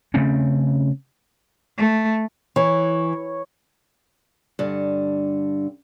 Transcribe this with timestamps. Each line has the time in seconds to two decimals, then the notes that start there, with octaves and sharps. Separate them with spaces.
0.14 C#3 A3 C4 C#4
1.78 A3
2.56 E3 C#5
4.59 G2 D3